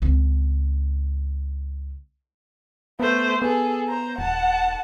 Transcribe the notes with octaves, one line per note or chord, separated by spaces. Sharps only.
C#2 C4
A3 B3 C5
B3 G#4 A4
C5 A#5
D#1 F#5 A5